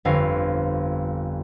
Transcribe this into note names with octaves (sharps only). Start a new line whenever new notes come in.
G1 F2 F5 C#6